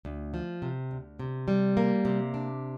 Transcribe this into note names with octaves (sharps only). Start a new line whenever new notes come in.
D2
F3
C3
D2
C3
G3
A#3
C3
D4